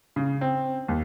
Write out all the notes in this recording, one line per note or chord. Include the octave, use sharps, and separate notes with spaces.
C#3
C4
D#2